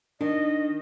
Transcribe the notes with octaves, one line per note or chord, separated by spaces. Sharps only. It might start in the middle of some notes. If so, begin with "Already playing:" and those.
D#3 D4 D#5